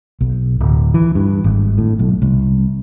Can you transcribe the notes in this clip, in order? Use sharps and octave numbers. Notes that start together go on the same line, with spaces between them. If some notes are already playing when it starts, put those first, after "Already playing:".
B1
D1
E3
G2
G#1
A2
B1
C2